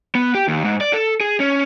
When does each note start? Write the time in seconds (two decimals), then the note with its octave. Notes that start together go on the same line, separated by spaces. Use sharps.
0.15 B3
0.35 G4
0.48 D#2
0.65 G#2
0.81 D5
0.93 A4
1.21 G#4
1.40 C#4